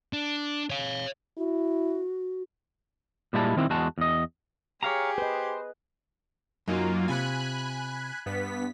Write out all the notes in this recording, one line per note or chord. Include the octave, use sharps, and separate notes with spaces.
D4
C#5 F5
E4 F#4
A#2 G3 G#3 E4 B4 A5
D#3 C4 E4
E2 G#3 F#4 A5
E2 D#5
G4 G#4 C#5 F5 A#5
B4 C5 D#5
F#2 F#3 A#3 D#4 F4
C3 F4 G#5 B5 F#6
G2 B3 B6